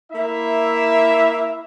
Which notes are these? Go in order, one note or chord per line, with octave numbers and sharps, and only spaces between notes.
A#3 E4 E5